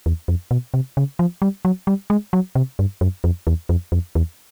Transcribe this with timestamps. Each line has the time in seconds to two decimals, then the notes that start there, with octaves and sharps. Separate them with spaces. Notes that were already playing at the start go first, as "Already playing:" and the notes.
0.06 E2
0.28 F2
0.51 B2
0.74 C3
0.97 C#3
1.19 F3
1.42 G3
1.65 F#3
1.87 G3
2.10 G#3
2.33 F#3
2.55 C3
2.79 G2
3.01 F#2
3.24 F2
3.47 E2
3.69 F2
3.92 F2
4.15 E2